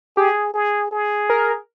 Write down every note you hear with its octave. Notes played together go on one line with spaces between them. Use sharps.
G4 G#4
G#4
G#4
A#4